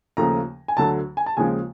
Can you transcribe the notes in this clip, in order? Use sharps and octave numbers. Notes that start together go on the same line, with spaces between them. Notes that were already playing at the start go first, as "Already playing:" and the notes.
D#2 C#3 F3 A3 A#5
G#5
D2 D3 F#3 A3 A5
G#5
A5
D#2 C#3 F3 G#3 G#5